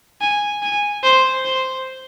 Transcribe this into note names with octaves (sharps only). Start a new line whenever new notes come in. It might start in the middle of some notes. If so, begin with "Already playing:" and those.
G#5
G#5
C5
C5